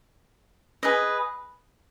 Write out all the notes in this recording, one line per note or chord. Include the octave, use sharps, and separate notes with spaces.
G#4 B4 D#5